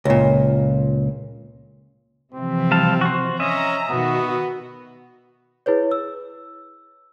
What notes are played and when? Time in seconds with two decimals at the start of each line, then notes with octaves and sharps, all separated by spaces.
0.05 C#2 A#2
2.34 C3 E3 F3 C4
2.71 G3 F5 A5
3.01 F#4 C5
3.40 C#4 D#5 E5 A#5
3.90 B2 D#3 B3 F#4
5.66 E4 G#4 B4 C#5
5.91 E6